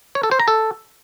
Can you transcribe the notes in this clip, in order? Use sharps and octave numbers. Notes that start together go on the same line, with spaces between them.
C#5
A4
C5
A#5
A4